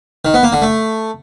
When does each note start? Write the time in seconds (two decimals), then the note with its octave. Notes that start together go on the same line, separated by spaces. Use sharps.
0.25 D#3
0.34 B3
0.43 A#3
0.53 D3
0.62 A3